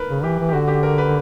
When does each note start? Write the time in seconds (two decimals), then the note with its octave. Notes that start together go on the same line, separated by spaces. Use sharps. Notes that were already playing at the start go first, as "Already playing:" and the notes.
Already playing: A#4 B4
0.09 C#3
0.23 E3 G4
0.39 E3
0.49 G4
0.53 D3 F#4
0.68 G4
0.83 A#4
0.98 B4